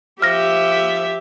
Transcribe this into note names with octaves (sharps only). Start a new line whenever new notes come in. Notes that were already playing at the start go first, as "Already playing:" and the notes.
F3 G4 E5 F6 A#6